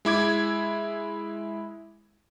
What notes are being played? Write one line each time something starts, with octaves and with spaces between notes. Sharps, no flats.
G#3 E4 D6 G#6